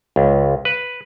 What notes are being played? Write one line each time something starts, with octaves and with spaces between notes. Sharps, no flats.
C#2
B4